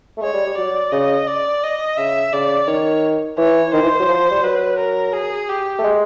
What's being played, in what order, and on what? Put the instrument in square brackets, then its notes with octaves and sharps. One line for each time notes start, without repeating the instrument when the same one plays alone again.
[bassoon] A3
[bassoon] G#3 [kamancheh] C#5
[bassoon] G3
G3
[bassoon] F#3 [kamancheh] D5
[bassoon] C#3 [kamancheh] D#5
[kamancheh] D5
D#5
[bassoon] C#3 [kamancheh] E5
[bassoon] C#3 [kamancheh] D5
[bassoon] D#3 [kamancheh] C#5
[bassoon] E3 [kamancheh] C#5
[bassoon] D#3 [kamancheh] C5
[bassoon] E3
F#3
F3
G3
[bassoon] F#3 [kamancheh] B4
[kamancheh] A#4
G#4
G4
[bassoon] A3
G#3